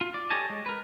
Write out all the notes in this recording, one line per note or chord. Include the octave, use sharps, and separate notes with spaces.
F4
D5
G4 A4 C#5 D#5 G#5 A5
G#3
A#4 B4